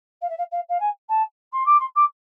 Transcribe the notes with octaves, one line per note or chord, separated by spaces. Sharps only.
F5
E5
F5
F5
F5
G#5
A5
C6
D6
C6
D6